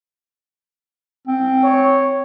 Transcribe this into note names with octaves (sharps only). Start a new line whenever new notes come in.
C4
C#5